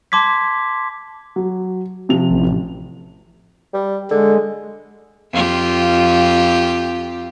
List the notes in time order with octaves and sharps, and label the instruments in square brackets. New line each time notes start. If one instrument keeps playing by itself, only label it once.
[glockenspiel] A5 C6 D6 G#6 B6
[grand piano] F#3
C3 F3 F7
[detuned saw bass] A1
[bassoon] G3
[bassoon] D3 [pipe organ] G#3
[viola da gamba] F2 F4 G4